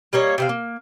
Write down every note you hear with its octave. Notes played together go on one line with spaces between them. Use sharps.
G3 A#3 C#5 D#5
C3 C4 F5
A#3